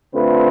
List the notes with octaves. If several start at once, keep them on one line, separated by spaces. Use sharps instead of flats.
D3 A3 C4 F4 B4